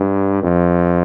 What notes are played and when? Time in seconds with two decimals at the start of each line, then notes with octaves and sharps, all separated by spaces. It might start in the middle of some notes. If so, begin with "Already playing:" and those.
Already playing: G2
0.43 F2